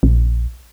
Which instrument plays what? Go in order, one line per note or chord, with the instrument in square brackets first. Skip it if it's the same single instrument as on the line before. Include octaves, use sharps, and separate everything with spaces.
[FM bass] A#1